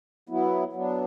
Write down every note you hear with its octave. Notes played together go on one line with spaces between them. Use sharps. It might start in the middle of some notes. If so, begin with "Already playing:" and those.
F#3 B3 E4
F#3 B3 D4